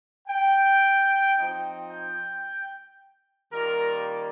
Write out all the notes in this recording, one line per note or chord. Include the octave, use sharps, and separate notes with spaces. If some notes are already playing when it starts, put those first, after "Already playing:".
G5
F3 C4 D#4
G5
D#3 G3 A#3 F4 A#4